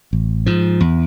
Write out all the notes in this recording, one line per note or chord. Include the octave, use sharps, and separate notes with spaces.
A1
G#2 F3
E2